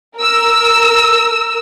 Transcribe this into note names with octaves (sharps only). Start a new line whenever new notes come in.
A#4 E6